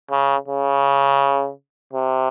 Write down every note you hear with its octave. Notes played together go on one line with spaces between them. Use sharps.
C#3
C#3
C3